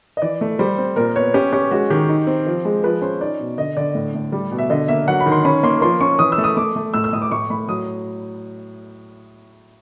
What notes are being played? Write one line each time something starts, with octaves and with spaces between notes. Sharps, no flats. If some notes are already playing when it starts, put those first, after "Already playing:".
D#5
E3 D5
A3
G3 C5
C4
A#2 A#4
B3 C#5
C#4 G4
C#4 G4
G#3 F#4
D#3 G4
D#4
C4
F3
G#3
F3 B4
C#4 C5
D#4 D5
B2
D3 D#5
D3 D5
A2
A2
G3
B2
E5
D3 D#5
A#3 E5
F#3 F#5
B5
D#3
C6
C#4 B5
A#3 C6
F3 C6
C#4 C#6
E3 D#6
E6
A3
D#6
A3 D6
A3
A2 E6
E6
A2 D#6
D6
A2 C#6
A2 B5
F#3 D#6